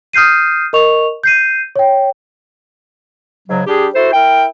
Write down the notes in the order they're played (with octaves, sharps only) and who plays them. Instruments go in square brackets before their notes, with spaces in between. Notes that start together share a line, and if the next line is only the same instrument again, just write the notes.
[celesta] D#6 F6 G6 C7 D#7
A#4 D#5 C#6 F7
G6 C7 D#7
C#5 G5
[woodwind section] G#2 C#3 F#3
G3 D4 G4 G#4
E4 F#4 A4 C5
E4 A#4 G5